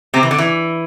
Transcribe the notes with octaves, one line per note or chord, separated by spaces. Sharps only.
C3 C4
E3
D3
E3